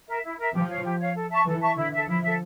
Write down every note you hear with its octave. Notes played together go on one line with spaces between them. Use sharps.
A#4 E5
E4
A#4 E5
F3 G4
C#5 F5
G4
C#5 F5
A4
E5 A5 C#6
E3 A4
E5 A5 C#6
D3 E4
A4 E5
F3 E4
A4 E5